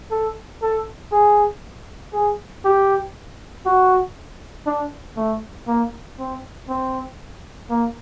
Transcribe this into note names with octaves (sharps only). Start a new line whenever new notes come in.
A4
A4
G#4
G#4
G4
F#4
D4
A3
A#3
C4
C4
A#3